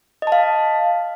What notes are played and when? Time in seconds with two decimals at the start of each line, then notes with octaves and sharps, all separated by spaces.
0.22 D#5
0.27 A5
0.32 F5